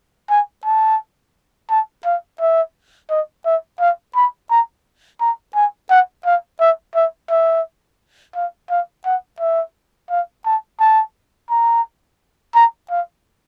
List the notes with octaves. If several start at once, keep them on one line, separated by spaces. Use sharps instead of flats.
G#5
A5
A5
F5
E5
D#5
E5
F5
B5
A#5
A#5
G#5
F#5
F5
E5
E5
E5
F5
F5
F#5
E5
F5
A5
A5
A#5
A#5
F5